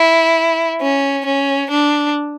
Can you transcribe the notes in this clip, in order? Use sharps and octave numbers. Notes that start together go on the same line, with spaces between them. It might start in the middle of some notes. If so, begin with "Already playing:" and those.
Already playing: E4
C#4
C#4
D4